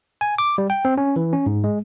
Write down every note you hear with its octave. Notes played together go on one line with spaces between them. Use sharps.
G#5
D6
G3
G5
C4
C#4
E3
C#4
G#2
G#3